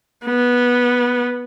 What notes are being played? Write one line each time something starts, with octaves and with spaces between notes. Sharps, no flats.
B3